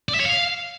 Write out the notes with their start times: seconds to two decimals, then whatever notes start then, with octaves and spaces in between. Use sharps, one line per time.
0.09 D5
0.14 E5
0.20 C#5
0.26 F5